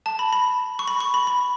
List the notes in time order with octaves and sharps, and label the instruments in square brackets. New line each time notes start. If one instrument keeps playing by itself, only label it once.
[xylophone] A5
B5
B5
C#6
B5
C#6
B5
B5